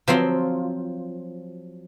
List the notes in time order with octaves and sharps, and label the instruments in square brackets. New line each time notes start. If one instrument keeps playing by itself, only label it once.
[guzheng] F3 F#3 C4 F4